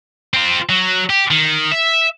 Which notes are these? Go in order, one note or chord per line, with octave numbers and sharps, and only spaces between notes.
C4 F4
F#3
G4
D#3
E5